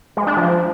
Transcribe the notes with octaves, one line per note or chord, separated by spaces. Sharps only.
G#3
D4
F3